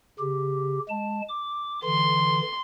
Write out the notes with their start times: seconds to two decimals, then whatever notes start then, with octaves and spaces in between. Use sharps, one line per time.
0.19 C#3 G4
0.89 G#3 A5
1.29 D6
1.84 D3 E3 C6